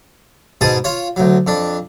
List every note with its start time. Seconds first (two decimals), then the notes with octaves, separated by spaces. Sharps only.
0.61 G#2 B2 G#4 A5 D#6
0.84 F4 C#5
1.16 D2 F#3
1.47 F2 D4